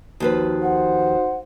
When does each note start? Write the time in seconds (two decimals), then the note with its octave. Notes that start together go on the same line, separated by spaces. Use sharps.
0.20 D#2 F3 D#4 F#4 B4
0.63 C5 F#5